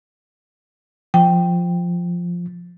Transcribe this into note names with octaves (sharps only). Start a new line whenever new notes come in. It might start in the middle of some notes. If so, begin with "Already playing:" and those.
F3 G5